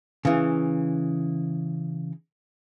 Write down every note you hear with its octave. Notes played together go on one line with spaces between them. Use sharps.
C#3 E3